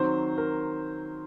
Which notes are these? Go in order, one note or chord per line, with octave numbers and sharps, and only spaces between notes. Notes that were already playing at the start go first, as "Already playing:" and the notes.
Already playing: D#3 F#3 C4 C5
A#4